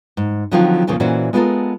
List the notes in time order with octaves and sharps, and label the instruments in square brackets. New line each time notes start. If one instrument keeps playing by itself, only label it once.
[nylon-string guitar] G#2
D3 D#3 F3 F#3 C4 F4
E2 A#2 C#3 F3 A#3
A#2 E3 C#4 F#4 C5
G#3 B3 F4 G4 A4 A#4